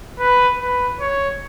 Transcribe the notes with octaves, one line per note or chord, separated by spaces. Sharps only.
B4
B4
C#5